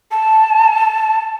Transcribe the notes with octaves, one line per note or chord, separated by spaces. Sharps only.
A5